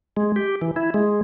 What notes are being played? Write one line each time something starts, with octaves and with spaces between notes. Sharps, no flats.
G#3
G4
E3
E4
G#3